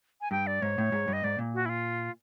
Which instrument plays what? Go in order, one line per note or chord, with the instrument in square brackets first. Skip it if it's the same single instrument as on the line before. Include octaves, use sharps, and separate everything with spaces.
[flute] G#5
[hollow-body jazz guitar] G2 [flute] G5
[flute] D5
[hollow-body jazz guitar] G#2 [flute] C#5
[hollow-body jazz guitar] A2
G#2
G2
[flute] D#5
[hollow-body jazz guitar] G#2 [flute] D5
[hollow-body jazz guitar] A#2
[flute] F#4
E4
F4